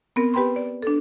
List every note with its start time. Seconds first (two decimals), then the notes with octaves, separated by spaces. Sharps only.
0.16 B3 C4 A#4
0.34 G4 B4 G5 B5 C6
0.56 D5
0.82 D4 A4